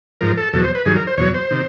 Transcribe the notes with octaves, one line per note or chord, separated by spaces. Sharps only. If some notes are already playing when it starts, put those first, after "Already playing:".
G#2 F3 A#4
A4
E2 B2 F#3 A4
C5
B4
G2 D#3 F#3 G#4
A#4
C5
E2 B2 F#3 C#5
C5
C3 D#3